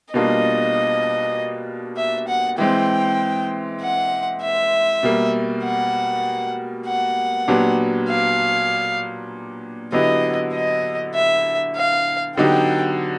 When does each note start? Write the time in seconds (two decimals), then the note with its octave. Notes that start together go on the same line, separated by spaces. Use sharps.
0.13 B2 G3 A#3 D4 F4 D#5
1.97 E5
2.28 F#5
2.58 E3 G#3 C4 G5
3.81 F#5
4.42 E5
5.03 B2 G3 A#3
5.64 F#5
6.86 F#5
7.48 A#2 F#3 B3 D4 G4
8.09 F5
9.92 D3 F#3 B3 E4 G4 D#5
10.54 D#5
11.14 E5
11.76 F5
12.37 D3 F#3 B3 D#4 G4 G5